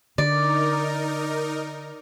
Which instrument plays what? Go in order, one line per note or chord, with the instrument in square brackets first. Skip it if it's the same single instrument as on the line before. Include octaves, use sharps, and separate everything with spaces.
[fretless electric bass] D3 [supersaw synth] D#4 A#4 [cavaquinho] D5